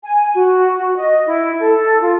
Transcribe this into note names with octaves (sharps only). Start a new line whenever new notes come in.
G#5
F#4
F#4
D#5
E4
A4
F4